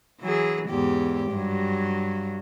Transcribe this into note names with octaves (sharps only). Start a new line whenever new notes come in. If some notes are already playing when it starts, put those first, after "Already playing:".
E3 F#3 G#4
E2 G#2 G4
G2 F#3